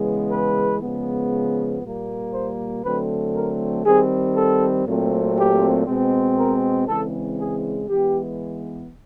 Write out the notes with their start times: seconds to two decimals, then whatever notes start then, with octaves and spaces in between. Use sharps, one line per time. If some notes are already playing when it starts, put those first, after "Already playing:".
Already playing: C#3 E3 G#3 B3
0.31 B4
0.82 C#3 F3 G#3 B3
1.83 A#2 G3 A#3
2.34 C5
2.84 D3 F#3 A3 C4 B4
3.35 A#4
3.85 D#3 G3 C4 G#4
4.35 A4
4.86 A#2 F#3 A3 C4
5.37 G4
5.87 B2 G#3 C4
6.38 A#4
6.87 C#3 E3 G#3 C4 A4
7.39 G#4
7.89 E3 G#3 B3 G4